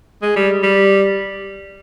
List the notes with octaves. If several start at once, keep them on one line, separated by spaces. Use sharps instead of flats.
G#3
G3
G3